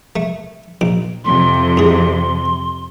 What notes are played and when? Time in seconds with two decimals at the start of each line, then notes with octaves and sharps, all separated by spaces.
0.16 A3
0.81 A#1 D6
1.25 F2 C3 C6
1.77 A2 G#4